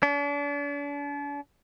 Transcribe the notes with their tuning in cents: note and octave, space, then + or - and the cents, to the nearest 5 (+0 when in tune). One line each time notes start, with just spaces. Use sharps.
D4 -40